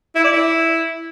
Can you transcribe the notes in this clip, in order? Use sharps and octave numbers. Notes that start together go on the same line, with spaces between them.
E4
D5
E4